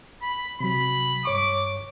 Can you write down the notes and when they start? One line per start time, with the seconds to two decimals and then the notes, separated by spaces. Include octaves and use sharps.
0.22 B5
0.60 C3 F#3 B5
1.25 G2 C#5 C#6 D6